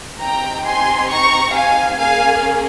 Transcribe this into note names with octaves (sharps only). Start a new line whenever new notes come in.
C4 D#4 G4 G5 A#5
G#5 C6
A#5 C#6
F5 G#5
A#3 C#4 G#4 F5 G#5